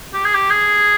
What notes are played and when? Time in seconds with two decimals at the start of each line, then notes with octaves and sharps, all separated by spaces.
0.14 G4
0.24 G#4
0.34 G4
0.50 G#4